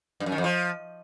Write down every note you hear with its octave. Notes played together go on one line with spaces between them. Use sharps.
G2
F#2
D#3
F2
F3